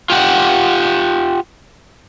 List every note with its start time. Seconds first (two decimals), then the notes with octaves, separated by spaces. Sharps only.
0.10 F4 G4 F#5